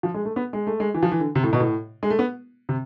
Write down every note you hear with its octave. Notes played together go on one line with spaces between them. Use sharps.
F3
G#3
A3
B3
G#3
A3
G#3
E3
F3
E3
D3
C3
A2
B2
A2
G#3
A3
B3
C3